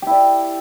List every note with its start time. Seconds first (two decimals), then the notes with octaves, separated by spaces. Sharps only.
0.02 G4
0.07 E4
0.11 D5